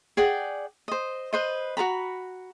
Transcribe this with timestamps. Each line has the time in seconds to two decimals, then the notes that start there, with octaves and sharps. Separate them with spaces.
0.17 G#4 D5 F#5 G5
0.88 C5 D#5
1.33 B4 C5 D#5
1.77 F#4 B4 A#5 B5